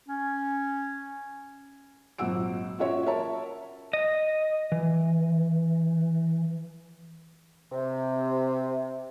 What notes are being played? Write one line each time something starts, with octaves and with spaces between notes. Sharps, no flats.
C#4
G#1 A#2 F#3 F#5 E6 D7
C#4 F4 F#4 C#5 E5
A#4 C#5 E5 A5
D#5
E3
C3